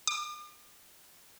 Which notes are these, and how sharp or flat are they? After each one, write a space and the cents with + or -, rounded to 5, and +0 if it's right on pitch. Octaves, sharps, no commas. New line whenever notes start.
D6 +45